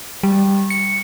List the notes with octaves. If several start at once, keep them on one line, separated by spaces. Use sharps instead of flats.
G3
C#7